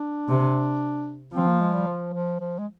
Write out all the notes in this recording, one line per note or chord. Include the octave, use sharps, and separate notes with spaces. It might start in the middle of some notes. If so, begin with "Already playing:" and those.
Already playing: D4
C3
F3 C4
A#3
G#3
G3
F3
F3
F3
G#3